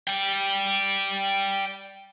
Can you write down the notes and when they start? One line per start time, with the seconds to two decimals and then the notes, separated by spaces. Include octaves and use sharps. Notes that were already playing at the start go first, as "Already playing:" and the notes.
0.08 D5 G5